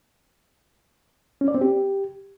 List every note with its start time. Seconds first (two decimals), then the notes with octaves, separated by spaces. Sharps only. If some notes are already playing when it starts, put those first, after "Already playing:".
1.41 C#4
1.48 D5
1.55 C4
1.61 G4